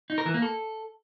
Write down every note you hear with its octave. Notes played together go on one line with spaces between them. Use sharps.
D#4
A#4
E3
A#3
A4